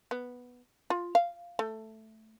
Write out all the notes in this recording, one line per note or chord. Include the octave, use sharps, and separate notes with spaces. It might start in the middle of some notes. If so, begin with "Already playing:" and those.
B3
F4
F5
A3